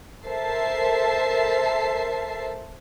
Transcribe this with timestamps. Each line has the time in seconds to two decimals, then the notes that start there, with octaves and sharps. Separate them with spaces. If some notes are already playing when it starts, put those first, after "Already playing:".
0.25 A4 A#4 C5 E5 A5 C7